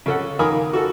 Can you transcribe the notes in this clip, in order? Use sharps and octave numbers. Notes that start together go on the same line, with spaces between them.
C#3 A4 F#5
D#3 A#4 F5 G#5 B5 D#6
F#4 A4